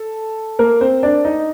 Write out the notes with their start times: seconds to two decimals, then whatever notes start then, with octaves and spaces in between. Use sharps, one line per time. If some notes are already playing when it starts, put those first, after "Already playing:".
Already playing: A4
0.59 A#3 A#4
0.81 C4 C5
1.03 D4 D5
1.24 D#4 D#5